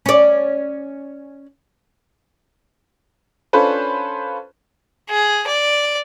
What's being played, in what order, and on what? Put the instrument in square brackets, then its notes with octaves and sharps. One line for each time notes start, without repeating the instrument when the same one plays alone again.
[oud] C#4 D5
[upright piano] C#4 D4 F4 A4 B4 C5
[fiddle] G#4
D5